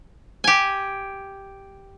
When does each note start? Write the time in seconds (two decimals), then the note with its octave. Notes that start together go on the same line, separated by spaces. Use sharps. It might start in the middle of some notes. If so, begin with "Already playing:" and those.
0.44 G4 G#5